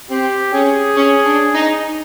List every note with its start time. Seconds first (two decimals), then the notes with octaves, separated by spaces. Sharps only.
0.11 C4 G4
0.54 C#4 G#4
0.97 C#4
1.25 D4
1.55 D#4